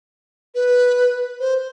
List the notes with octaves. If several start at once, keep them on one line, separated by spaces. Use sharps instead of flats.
B4
C5